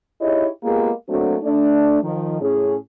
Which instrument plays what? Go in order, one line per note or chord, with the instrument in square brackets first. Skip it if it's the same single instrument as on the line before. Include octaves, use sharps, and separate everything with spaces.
[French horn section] D#4 E4 G4 G#4 C#5 D#5
G#3 A#3 B3 F4 G4 G#4
F#3 A3 A#3 C4 D4 F#4
A3 D4
D#3 F3
A2 C#4 G#4